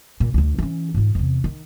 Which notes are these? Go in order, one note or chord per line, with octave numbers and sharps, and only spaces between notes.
A#2
D2 D3
E3 C#4
G#2 F4
E2 C3
D#3